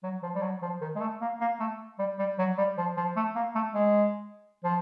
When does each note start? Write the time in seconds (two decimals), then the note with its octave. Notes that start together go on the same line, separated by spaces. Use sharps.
0.03 F#3
0.23 F3
0.35 G3
0.42 F#3
0.62 F3
0.81 D#3
0.95 G#3
1.00 A3
1.21 A#3
1.41 A#3
1.60 A3
1.99 G3
2.19 G3
2.38 F#3
2.58 G3
2.78 F3
2.97 F3
3.16 A3
3.35 A#3
3.55 A3
3.75 G#3
4.64 F3